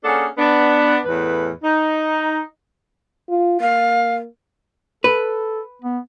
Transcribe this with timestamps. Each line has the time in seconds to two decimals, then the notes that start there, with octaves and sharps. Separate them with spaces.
0.04 A#3 C#4 D4 G#4 A4 F#5
0.38 B3 D4
1.05 E2 A2 B4
1.62 D#4
3.29 F4
3.61 A#3 F5
5.04 A4 B4
5.82 B3